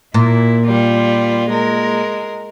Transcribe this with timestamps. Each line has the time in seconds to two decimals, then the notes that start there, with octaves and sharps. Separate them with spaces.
0.14 A#2 E4
0.66 G3 F4
1.49 G#3 A#4